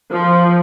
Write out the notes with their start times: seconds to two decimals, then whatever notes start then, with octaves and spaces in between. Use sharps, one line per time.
0.12 F3